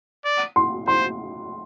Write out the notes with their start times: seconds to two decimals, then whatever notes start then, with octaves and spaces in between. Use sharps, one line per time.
0.25 D5
0.56 C6
0.87 C5 C6